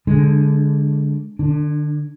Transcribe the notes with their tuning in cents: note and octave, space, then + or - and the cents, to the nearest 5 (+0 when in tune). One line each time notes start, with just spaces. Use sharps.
D3 -10 G#3 +0 D4 +15
D3 +35 D4 +0